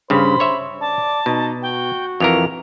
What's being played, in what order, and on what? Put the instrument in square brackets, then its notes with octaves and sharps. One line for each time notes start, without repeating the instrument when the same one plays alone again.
[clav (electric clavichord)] G2 C#3 [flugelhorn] C5 [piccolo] B5
[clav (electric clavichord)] C#5 E5
[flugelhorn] D5 [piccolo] A5
[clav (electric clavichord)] B2 [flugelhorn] D#4
[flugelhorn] F#4 [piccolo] G5
[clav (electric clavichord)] F2 E3 A#4 [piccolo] F7